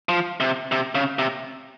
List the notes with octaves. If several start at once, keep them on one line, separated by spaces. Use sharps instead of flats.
F3
C3
C3
C#3
C3